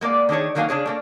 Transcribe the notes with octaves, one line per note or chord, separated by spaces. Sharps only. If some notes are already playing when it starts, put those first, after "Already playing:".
G#3 A#3 B3 D5
D#3 A3 D4 G#4 C#5
D3 D#3 F#3 A#3 F5 G#5
C#3 D4 G#4 C#5
A3 A#3 D4